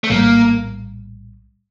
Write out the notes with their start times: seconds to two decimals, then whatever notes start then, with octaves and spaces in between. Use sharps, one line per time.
0.04 A3
0.10 A#1 A2 G3 A#3